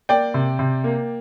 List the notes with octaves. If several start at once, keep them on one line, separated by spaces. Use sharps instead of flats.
A#3 D5 G5
C3
C3
A#3